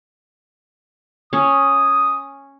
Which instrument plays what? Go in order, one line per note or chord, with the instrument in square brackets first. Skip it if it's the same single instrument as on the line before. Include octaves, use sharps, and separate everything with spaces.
[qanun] C#4 [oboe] D#6